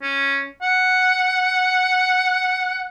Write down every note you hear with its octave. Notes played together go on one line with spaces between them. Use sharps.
C#4
F#5